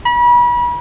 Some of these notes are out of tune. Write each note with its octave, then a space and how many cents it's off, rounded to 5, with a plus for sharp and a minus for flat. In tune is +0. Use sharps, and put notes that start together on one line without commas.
B5 -35